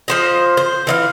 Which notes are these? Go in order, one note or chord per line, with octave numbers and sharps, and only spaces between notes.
F3 C5 D#5
C5
E3 D#5 F5